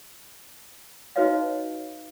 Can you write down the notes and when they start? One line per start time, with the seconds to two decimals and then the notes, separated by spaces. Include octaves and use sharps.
1.16 D#4 F#4 B4 C#5 D#5 F5